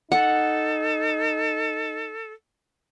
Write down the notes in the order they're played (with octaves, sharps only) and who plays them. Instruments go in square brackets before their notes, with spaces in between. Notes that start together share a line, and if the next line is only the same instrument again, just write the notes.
[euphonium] D#4 [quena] A4 [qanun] F#5